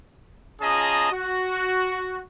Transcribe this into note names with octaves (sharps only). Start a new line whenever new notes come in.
C#4 F4 G#4 D#5 A5 A#5
F#4